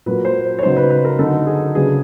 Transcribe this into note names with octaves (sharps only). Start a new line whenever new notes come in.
A#2 F#3 A#3 B4
C5
C#5
C#3 F#3 B3 D#4 C5
B4
B4
A#4
D3 F#3 B3 D#4 A4
G#4
C#3 F#3 B3 D4 G#4